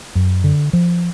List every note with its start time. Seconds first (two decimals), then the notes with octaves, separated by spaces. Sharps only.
0.15 F#2
0.44 D3
0.73 F3